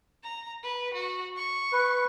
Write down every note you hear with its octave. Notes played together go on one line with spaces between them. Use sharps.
A#5
B4
F#4
C#6
B4